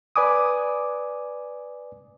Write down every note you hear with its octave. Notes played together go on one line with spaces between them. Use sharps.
B4 D5 G#5 D6 D#6